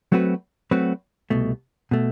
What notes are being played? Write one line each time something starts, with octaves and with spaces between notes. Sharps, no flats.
F#3 A3 C4 F#4 B4
F#3 A3 C4 F#4 B4
C2 B2 A3
B2 A3